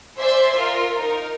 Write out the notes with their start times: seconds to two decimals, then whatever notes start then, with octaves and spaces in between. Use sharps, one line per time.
0.17 C5 D5 E5 G#5 C6
0.54 F4 A#4
0.98 D#4 A#4